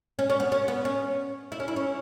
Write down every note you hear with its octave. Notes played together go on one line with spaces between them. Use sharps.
C#4
C#4
B3
C#4
B3
C#4
E4
C#4
E4
C#4